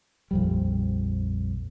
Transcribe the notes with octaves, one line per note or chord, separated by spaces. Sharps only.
A#1 F2 G3